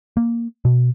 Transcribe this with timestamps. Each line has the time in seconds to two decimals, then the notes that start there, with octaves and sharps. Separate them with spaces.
0.17 A#3
0.65 B2